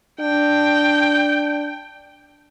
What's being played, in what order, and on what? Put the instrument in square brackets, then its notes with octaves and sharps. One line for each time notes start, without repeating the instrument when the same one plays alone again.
[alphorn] D4 [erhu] G5